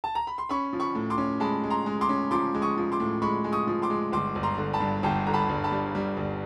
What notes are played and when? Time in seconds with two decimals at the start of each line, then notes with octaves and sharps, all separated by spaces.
0.04 A5
0.15 A#5
0.27 B5
0.38 C6
0.49 C#4 B5 C#6
0.73 F3
0.80 B5 C#6
0.95 A2
1.10 C6 D6
1.18 C#4
1.40 G#3 A5 B5
1.64 G#3
1.70 A#5 C6
1.86 G#3
2.01 C6 D6
2.09 C#4
2.31 F3 C6 D6
2.54 G#3
2.62 C#6 D#6
2.77 F3
2.92 C6 D6
3.00 A2
3.22 G#3 B5 C#6
3.44 G#3
3.52 C#6 D#6
3.67 F3
3.82 C6 D6
3.90 G#3
4.12 G1 C6 D6
4.35 G1
4.43 A#5 C6
4.58 D3
4.73 A5 B5
4.80 G2
5.03 G1 G5 A5
5.27 D3 A#5
5.34 A5 B5
5.49 G1
5.64 A5 B5
5.72 G3
5.95 G3
6.17 G1